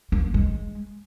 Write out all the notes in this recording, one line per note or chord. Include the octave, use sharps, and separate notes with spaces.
A#3
G#3